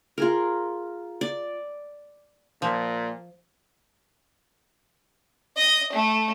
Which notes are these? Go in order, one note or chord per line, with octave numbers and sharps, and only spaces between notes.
F4 G#4 A#4
D5
A#2 F3
D#5
A3